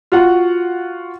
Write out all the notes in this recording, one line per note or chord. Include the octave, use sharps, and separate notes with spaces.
F4 F#4 F#5